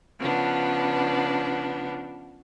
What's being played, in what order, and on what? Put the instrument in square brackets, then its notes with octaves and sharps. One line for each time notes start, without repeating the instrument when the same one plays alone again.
[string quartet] C#3 F3 B3 D4